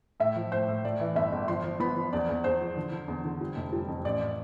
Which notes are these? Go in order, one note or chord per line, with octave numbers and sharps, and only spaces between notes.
A2 E5
F3
A2 C5
A2
A3 D5
E3
G1 E5
G1
F3 C6
F3
B3 B5
F3
E2 D5
E2
E2 C5
F3
D3
D3
E2
D3
G3
F1
G3
F2
A1 D5